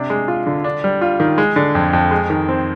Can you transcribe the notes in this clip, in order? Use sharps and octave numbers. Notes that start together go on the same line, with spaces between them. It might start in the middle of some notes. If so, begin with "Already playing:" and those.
Already playing: C3 D4
G#3
F4
D3
D4
G3
F4
D#3
G#3
D3
F2
F2
G#3
D#3
C4